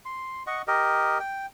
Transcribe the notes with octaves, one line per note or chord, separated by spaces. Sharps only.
C6
D#5 F#5 C#6
G4 A#4 D#5
G5